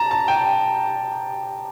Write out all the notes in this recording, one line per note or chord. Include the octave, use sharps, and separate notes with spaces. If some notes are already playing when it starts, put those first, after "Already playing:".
Already playing: A5 A#5
A5
G5